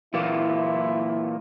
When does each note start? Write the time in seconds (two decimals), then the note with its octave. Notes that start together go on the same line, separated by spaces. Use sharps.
0.14 A#2 E3 A#3 E4